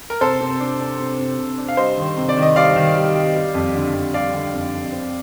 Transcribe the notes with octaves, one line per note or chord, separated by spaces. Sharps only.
A#4
C3 A4 C5
C3
D4
D4
C3
C3
C3
D4
F5
G3 C5 D#5
D#3
C3
D5
D#3 D#5
G3 D5 F5
D#3
G3
G3
G3
F2
D3
F2
G3 D5 F5
D3
F2
F2
C4